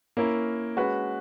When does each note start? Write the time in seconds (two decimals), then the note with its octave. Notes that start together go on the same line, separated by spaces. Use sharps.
0.17 A#3 C#4 E4 A#4
0.77 G#3 C#4 F#4 B4